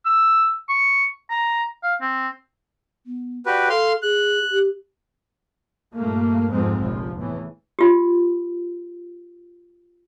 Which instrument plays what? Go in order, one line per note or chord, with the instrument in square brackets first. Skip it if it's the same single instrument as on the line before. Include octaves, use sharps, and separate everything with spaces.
[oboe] E6
C#6
A#5
F5
C4
[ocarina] B3
[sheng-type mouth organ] F#4 G4 B4 [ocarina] D5
[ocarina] A4 [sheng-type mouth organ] F5 C6
[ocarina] G#4 [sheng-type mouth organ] F#6
[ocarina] G4
[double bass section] G2 A#2 A3 A#3
F2 G#2 F3 G#3 C4
F1 A#1 F3
E2 A2 E3
[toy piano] F4 G4